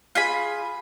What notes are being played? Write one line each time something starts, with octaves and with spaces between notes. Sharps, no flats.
F4 G#4 B5